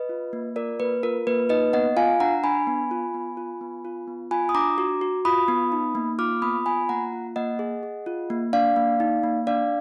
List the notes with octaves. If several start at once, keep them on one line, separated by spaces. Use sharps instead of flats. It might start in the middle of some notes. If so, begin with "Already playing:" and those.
Already playing: B4 D#5
F4
A#3
F4 A#4 D5
A#3 B4
F4 A#4
A#3 B4
D#4 B4 D#5
B3 D#5 F#5
F4 F5 G#5
D4 F#5 A#5
D4 G#5 B5
B3
F4
B3
F4
B3
F4
B3
F4 G#5 B5
D#6
D4 A#5 D6
F#4
F#4
F4 B5 D#6
B3
D#4
A#3
F4 D6 F6
B3 B5 D#6
F4 G#5 B5
A#3 F#5 A#5
F4
A#3 D#5 F#5
G#4
G#4
F4
A#3
D4 D5 F5
A#3
D#4
A#3
D4 D5 F5